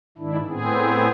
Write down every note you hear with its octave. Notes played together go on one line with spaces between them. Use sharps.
G#2 D#3 D4 E4
A2 B3 C4 G#4